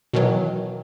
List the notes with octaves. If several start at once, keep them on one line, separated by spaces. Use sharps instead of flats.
B2 D#3 E3 F#3